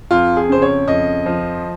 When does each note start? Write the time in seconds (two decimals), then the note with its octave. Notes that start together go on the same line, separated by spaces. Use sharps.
0.11 F2 F4
0.36 G#4
0.49 C#3 C5
0.62 C#5
0.87 F2 D#5
1.26 F3